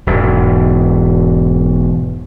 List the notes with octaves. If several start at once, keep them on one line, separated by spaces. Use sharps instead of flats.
E1 E2 G#2